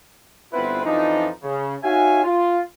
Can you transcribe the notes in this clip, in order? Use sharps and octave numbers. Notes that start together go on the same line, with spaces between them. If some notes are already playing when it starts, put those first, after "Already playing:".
G1 B3 C4 E4 F4 B4
F2 E3 F3 D4 D#4
C#3
D#4 F#4 C#5 E5 F5 G#5
F4